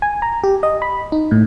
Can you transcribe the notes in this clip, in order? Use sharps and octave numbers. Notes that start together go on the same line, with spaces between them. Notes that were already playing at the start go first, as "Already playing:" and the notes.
G#5
A#5
G4
D#5
B5
D#4
A2